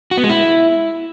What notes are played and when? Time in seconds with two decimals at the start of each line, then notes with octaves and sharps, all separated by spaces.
0.11 F#4
0.17 B3
0.23 G#3
0.30 E4